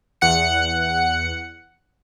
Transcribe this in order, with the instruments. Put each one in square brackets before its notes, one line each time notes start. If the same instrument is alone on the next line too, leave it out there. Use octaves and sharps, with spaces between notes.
[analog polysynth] E2 F#5 C#7